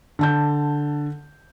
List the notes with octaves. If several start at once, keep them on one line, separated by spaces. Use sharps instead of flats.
D3 A5 G6